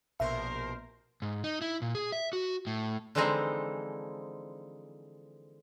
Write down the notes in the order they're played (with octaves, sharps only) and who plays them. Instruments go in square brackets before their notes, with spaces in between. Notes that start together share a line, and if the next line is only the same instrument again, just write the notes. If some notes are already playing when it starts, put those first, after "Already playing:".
[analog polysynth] A#1 B2 A#4 [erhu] C5 [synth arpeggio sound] E5
[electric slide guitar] G#2
D#4
E4
A#2
G#4
E5
F#4
A2
[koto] D3 E3 F3 G#3 C4 D#4